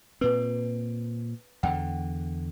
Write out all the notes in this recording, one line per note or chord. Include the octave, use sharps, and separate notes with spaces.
A#2 C4 B4
E2 D3 F#5 G5